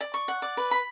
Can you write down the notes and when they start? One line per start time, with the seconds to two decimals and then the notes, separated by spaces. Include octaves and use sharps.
0.01 D5
0.14 C#6
0.28 F#5
0.42 D5
0.57 B4
0.71 B5